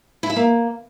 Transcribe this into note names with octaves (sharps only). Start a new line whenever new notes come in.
E4
E5
A#3